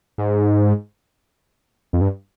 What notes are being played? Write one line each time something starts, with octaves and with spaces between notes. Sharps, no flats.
G#2
F2
G2